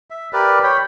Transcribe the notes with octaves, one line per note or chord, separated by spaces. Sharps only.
E5
G4 A#4 B4 D5
C#5 G5 B5